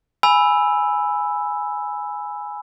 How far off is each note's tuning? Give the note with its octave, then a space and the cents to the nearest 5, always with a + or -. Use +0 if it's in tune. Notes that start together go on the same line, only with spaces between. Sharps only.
G#5 +0 B5 +0 E6 +0